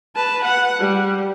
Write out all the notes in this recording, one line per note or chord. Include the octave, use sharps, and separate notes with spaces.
B4 A5
F#5
G3